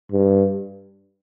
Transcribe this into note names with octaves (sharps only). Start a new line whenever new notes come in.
G2